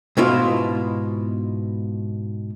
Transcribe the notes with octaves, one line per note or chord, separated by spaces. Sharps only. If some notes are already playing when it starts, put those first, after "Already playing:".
G#2 B2 E4 F4